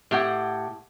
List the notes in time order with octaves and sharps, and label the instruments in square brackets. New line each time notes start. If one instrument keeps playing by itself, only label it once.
[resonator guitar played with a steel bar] A2 G4 F#5